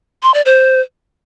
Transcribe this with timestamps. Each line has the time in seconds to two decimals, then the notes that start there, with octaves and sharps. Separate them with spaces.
0.23 C6
0.34 D5
0.46 C5